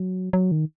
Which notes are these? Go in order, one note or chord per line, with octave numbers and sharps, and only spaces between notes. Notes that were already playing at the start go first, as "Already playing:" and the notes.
Already playing: F#3
F#3
D#3